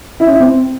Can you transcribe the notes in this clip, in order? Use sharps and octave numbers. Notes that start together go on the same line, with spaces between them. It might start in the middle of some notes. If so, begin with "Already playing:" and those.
E4
C#4
E4
C4